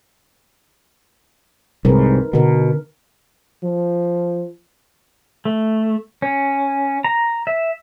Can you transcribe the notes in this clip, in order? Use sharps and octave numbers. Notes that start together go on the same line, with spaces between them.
C2 G#2 D#4 A#4 B4
B2 D3 A#4
F3
A3
C#4
A#5
E5